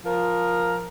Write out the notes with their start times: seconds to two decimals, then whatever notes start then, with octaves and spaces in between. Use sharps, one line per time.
0.06 F3 A#4